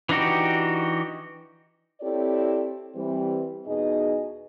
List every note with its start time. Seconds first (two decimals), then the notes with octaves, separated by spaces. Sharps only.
0.09 E3 D4 D#4 F#4 G4
2.01 C4 E4 G4 A4 C#5 D5
2.96 E3 G3 C4
3.66 E2 B2 D#4 G#4 D#5